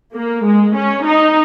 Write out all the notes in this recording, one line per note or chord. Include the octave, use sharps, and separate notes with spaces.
A#3
G#3
C#4
D#4